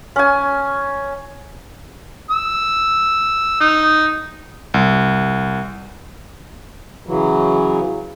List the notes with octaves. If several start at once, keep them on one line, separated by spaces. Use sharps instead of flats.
C#4 G#5
E6
D#4
C2
C#3 E3 F#3